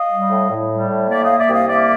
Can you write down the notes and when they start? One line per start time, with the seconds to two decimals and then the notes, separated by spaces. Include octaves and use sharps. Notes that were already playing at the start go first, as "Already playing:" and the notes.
Already playing: D#5 F5
0.11 G3
0.30 A2
0.50 A2
0.69 G3
0.89 A2
1.08 A#3 D5 E5
1.24 A#3 D#5 F5
1.39 D5 E5
1.49 C2 D#5 F5
1.68 A#3 D5 E5